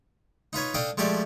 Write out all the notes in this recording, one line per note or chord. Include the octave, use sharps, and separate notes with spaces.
D#4 F4 B4 C#5
D4 A4 D#5 F5 G5
F3 G#3 A3 G4 A4 D5